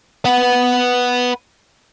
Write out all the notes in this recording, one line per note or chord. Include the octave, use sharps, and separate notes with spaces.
B4 F#5